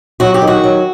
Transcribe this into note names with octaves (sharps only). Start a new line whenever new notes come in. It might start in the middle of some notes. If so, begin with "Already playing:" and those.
F#3 F#4
G4
D#3
F#4
F#3